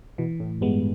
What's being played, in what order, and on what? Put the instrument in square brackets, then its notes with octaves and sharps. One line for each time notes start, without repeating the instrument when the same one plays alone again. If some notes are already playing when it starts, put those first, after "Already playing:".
[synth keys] B2 [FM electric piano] E3
[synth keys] A2
[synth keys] G2 [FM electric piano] G#3 B3